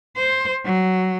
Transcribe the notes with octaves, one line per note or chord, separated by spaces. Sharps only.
C5
F#3